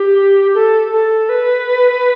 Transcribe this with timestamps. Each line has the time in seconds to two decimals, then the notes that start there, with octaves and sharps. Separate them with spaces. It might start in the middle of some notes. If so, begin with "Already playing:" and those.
Already playing: G4
0.55 A4
0.92 A4
1.29 B4